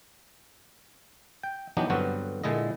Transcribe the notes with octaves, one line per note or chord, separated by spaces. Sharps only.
G5
E3 F#3 B3 D4 D#4 G4
G2 D3 F#3 B3 C4 F#4
A#2 D3 G#3 E4 D#5